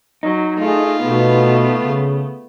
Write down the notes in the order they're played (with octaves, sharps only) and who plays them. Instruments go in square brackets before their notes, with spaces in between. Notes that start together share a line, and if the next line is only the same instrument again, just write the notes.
[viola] F#3 [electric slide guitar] D#4
[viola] A3 [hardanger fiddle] F4 [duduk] G#4
[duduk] B2 [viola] A3 B3
[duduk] C#3